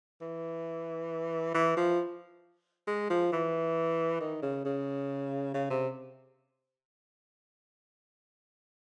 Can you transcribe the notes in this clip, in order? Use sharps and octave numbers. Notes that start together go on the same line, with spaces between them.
E3
E3
F3
G#3
F3
E3
D#3
C#3
C#3
C#3
C3